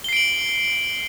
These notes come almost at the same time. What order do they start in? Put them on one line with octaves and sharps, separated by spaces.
G7 C7 D7 F#7